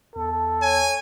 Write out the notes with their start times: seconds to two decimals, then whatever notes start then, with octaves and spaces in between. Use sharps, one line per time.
0.16 E2 A4
0.62 C#5 G#5